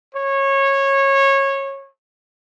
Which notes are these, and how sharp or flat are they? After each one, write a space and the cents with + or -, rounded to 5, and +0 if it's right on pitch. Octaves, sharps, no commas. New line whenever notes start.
C#5 -20